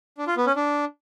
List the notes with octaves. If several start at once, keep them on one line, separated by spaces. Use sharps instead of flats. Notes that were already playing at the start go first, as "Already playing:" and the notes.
D4
F4
B3
C#4
D4